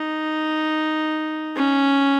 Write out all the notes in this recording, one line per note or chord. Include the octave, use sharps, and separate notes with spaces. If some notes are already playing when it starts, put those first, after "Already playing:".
Already playing: D#4
C#4